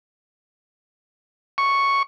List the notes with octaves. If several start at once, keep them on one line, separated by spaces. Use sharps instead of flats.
C#6